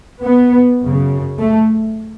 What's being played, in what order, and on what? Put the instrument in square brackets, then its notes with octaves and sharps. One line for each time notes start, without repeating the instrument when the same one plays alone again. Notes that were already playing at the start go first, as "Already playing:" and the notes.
[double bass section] B3
F#2 C#3
A3